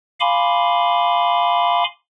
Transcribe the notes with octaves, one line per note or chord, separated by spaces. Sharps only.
F5 G#5 B5 C6 D6